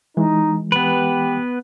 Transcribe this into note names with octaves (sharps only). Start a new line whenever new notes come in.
E3 G#3 D#4
B3 G4 B4